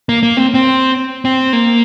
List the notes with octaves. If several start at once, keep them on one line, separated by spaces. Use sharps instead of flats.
A#3
A#3
C4
C4
C4
A#3